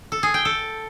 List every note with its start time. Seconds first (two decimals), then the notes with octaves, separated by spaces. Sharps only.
0.12 A4
0.23 G#4
0.34 G5
0.45 A4